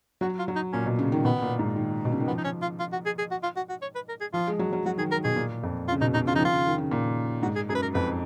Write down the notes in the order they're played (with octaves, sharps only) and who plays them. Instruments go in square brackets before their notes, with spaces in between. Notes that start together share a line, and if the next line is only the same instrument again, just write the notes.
[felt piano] F#3 [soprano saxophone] F#4
[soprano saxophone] F4
[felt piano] F#3
[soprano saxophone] D#4
[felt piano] A#2 [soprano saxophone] C#4
[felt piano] B2
C#3
D#3
[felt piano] B2 [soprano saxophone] B3
[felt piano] A#2
G#2
D#3
B2
C#3
D#3
[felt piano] F3 [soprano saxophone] B3
[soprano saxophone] D#4
C#4
F4
F4
F#4
G#4
G#4
F#4
F4
F#4
F#4
C#5
B4
A#4
G#4
[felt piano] F3 [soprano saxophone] F4
[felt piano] G#3
F#3
F#3
[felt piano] F#3 [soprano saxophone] F#4
[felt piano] D#3 [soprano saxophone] G#4
[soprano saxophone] A#4
[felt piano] B2 [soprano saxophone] G#4
[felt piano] A#2
F2
[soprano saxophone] F4
[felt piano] C#3
[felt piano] B2 [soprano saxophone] D#4
[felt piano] B2 [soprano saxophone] D#4
[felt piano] C#3 [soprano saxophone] F4
[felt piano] F3 [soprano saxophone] D#4
[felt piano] D#3
[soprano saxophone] F4
[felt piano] C#3
D#3
C#3
A#2
[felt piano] G#2 [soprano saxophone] F#4
[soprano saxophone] G#4
[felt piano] F#2 [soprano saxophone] G#4
[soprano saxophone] B4
A#4
[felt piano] F2 [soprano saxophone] B4